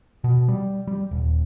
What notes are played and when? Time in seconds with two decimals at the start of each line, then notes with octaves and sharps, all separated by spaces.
0.24 B2
0.48 G3
0.87 G3
1.11 D#1